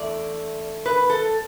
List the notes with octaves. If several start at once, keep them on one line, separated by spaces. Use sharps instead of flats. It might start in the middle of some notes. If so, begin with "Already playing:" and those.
Already playing: E2 D3 A3 D5
B4
A4